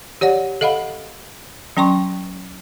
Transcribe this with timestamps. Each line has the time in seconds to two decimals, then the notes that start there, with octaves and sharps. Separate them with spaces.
0.21 G4 C#5 D5 F#5
0.61 A4 D#5 F5 F#5 B5
1.77 F#3 C#4 G5 C6 C#6